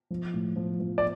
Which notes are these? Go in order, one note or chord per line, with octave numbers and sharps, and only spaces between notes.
F3
A2
F3
F3
D5